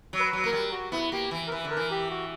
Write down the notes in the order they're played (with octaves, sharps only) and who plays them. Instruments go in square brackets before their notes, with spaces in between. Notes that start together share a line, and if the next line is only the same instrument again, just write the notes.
[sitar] F#3
[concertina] B4
[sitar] F#3
[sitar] A#3 [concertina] A#4
[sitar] G3
[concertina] F#4
[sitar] B3 [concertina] E4
[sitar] A#3 [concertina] G4
[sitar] E3
[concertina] A#4
[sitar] E3 [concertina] B4
[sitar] D3
[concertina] A#4
[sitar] E3
[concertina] G4
F#4